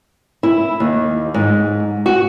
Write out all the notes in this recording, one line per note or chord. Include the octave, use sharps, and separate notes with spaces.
E4
D#2
G#2
F#4